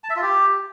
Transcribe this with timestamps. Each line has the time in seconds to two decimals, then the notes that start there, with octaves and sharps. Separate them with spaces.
0.04 A5
0.10 E5
0.16 F4
0.22 G4